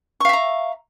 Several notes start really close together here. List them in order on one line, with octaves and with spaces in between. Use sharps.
C#6 F5 E5 A#5